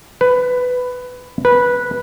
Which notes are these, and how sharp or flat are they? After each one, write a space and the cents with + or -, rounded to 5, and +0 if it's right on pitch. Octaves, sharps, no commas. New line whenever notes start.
B4 +15
B4 -10